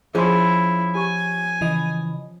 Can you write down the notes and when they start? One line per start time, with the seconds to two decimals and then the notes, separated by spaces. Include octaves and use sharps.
0.15 F3 C#4 E4 G#4 C6
0.95 G4 G#5 C#6
1.61 C#3 E3 D#5